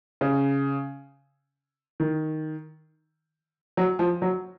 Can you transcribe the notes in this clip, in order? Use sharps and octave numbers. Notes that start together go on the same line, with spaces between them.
C#3
D#3
F#3
F3
F#3